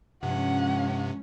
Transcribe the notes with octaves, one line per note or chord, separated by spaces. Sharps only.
G2 C3 F3 G#3 C#4 F#5